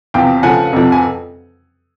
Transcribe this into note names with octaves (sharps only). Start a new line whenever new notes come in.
E2 C3 F3 F5 G5
C#3 F3 A3 F#5 G#5
F2 C3 F3
G#5